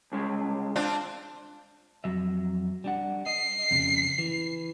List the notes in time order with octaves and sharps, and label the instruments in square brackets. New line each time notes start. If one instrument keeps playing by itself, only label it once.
[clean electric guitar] C2 C#3 G#3
[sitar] C4 D4 F4
[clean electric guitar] F2 F#3 E5
G3 D4 F#5
[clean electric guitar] D#5 [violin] C7
[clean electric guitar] F2 A#2 C#3
E3